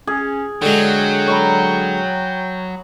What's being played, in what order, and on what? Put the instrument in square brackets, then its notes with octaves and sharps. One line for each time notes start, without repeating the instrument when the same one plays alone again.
[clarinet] C#4 [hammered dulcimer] G#4
[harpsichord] D3 G#3 [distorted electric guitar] F#3 [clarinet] G5
[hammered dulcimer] C#5 A#5 B5